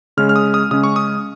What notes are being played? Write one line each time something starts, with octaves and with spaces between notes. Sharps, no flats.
C#3 G#3 C#4 F6
F6
D#6
D#6
C#3 G#3 C#4 D#6
C#6
D#6